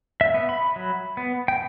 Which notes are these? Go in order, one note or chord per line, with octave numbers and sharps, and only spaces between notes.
E5
B3
B5
F#3
B3
G5